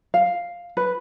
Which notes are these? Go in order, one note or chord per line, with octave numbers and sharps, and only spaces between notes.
F5
B4